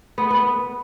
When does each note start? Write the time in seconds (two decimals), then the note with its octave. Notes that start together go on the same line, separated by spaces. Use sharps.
0.18 B3
0.31 B3